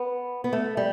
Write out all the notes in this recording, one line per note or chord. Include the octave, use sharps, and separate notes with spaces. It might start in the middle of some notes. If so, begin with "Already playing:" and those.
Already playing: B3
B3
A3
G3